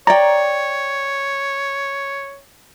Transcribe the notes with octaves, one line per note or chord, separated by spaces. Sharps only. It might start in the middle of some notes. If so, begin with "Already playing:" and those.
C#5 D5 G5 A#5